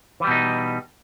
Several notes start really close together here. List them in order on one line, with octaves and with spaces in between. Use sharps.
E3 G3 B2 D#4